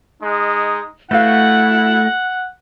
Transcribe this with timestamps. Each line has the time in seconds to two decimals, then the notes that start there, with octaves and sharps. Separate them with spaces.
0.22 G#3 D#4
1.11 A3 E4 F#4 B4 F5 F#5